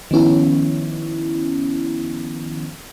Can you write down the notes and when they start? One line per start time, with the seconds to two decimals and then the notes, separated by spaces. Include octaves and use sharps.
0.11 D#3 F3 B3 C#4 E4